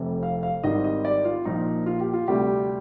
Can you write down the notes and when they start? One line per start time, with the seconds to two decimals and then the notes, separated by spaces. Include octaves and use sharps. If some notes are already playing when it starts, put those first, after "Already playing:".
Already playing: F1 F2 C3
0.23 F5
0.43 F5
0.63 G#1 G#2 D#3 G3 C4 D#5
0.84 D#5
1.05 D5
1.25 F4
1.45 A#1 A#2 F3 D#4
1.86 F4
2.00 G4
2.14 F4
2.28 D2 C3 G3 G4